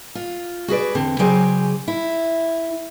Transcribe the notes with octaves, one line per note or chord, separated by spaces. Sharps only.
F4
F#4 G#4 B4 D5
E2 D3 C4
C#3 F#3 G4 G#4 C5 D5
E4